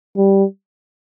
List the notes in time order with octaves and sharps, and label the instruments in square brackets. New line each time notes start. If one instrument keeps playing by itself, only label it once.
[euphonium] G3